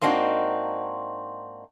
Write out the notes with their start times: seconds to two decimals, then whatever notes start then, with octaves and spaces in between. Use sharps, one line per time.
0.01 G#2 A#3 C4 D4 D#4 F#4